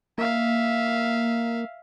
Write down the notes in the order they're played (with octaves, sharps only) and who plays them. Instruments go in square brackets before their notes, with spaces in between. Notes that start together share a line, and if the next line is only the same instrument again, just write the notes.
[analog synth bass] A#3 [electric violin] E5 F5